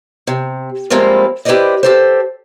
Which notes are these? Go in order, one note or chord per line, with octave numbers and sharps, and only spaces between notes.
C3
F3 G3 G#3 A#3 C4 E4
E4 G4 B4 C5 D5 D#5
G4 A4 C5